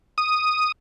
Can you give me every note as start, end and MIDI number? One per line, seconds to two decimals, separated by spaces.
0.18 0.72 87